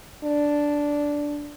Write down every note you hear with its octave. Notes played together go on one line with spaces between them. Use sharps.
D4